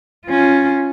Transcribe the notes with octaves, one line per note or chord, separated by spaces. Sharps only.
C#4 F4